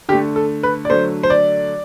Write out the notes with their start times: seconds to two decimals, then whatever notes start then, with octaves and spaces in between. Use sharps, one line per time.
0.09 D3 G4
0.13 A3
0.36 A4
0.63 B4
0.85 D5
0.89 D3 F#3 A3 C5
1.23 C5
1.30 D5